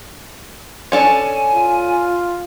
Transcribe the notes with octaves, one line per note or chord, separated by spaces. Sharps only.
C#4 D4 A4 G#5
F4